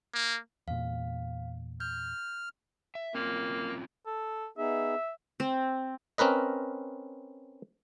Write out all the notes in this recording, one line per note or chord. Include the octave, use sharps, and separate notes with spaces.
A#3
E2 A#2 F5
F6 G6
E5
A#3 C4 C#4 F4
A4
B3 D#4 G#4 E5
C4
C4 C#4 A#4 B4 D#5